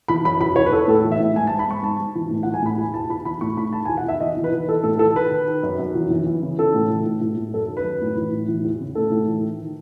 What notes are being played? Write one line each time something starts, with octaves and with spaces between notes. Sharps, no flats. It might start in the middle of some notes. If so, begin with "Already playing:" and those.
E3 B5
F#2 B5
E2 B5
E2 C#5
B4
E2 A4
A2 A4
E3
E5
A2
G#2 G#5
A5
G#2
B5
G#2 C#6
G#2 A5
G#2
E3
A2
F#5
E3
G#5
A2 B5
E2 G#5
E2 A5
E2 B5
E3 B5
A2 C#6
A2 B5
D#3 A5
G#5
E2
F#5
E2 E5
E3 D#5
E3
B4
E3
E3 A4
A2 A4
E3 A4
D#3 B4
D#3
D#3
F#2
F#2
E3
E3
E3
C#3
E3 A4
A2
E3
A2
A2
A2
F#2 A4
D#3
B4
F#2
A2
E3
A2
E3
E2
C#3
A2 A4
A2
E3
D#3
D#3